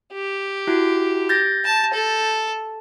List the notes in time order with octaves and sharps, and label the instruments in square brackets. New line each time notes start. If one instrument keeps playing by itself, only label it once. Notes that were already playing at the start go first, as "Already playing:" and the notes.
[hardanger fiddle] G4
[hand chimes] E4 F#4
G6 A6 A#6
[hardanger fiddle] A5
A4